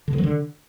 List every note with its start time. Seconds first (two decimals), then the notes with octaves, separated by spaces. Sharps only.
0.08 D3
0.13 D#3
0.18 F#3
0.24 D3